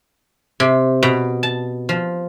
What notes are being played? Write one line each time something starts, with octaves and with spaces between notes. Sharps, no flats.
C3
B2
A5
F3